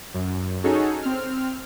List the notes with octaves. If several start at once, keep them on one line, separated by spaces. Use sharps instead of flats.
F#2
C#4 D#4 F#4 G#4 A4 C#5
C4 F6